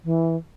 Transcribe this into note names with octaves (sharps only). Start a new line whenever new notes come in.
E3